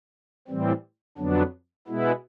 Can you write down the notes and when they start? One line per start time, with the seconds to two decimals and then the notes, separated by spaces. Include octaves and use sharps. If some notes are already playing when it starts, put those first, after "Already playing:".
0.48 A2 E3 G3 C4
1.18 F2 D3 F#3 B3 D4
1.87 B2 G#3 B3 E4